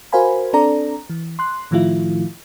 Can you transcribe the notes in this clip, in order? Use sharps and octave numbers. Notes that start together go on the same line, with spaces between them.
F#4 A#4 C5 F5 G#5 B5
C4 D4 A4 D5 A#5
E3
C6 F#6
A2 D#3 F3 A3 E4 F4